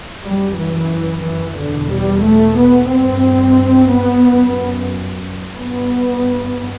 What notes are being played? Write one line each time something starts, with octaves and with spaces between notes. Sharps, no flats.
F#2 G3
E3
E3
E2 B2 D3
G3
A3
B3
G2 C4
B3
F#2
G2 B3